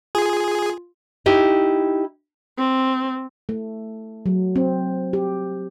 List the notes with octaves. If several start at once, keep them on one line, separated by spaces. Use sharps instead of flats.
F4 G#4
D#4 E4 G4
C4
A3
F#3
C4
G4